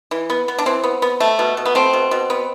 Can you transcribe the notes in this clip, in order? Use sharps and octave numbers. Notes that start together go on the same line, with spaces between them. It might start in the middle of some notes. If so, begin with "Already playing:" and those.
E3
B3
B3
D4
E3 C4
B3
B3
A3
B2
B2
B3
A3 C4
B2
B2
B3